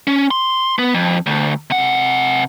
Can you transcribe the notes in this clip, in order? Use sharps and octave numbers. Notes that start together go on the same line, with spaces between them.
C#4
C6
B3
F2
D2
C3 F#5